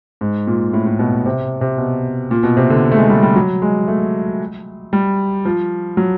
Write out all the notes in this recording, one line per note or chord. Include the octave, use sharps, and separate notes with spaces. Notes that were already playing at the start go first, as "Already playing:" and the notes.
G#2
A#2
A2
A2
B2
C3
C3
B2
A#2
B2
C3
D3
A3
G#3
G3
G3
F#3
G#3
A3
G3
F3
F#3